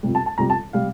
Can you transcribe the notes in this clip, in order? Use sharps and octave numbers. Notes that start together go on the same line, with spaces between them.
F2 C3 G3
A5
A5
F2 C3 G3 A#5
A5
C3 G3 F5